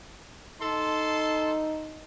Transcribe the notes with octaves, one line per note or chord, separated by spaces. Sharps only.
D#4 A4 A5 C6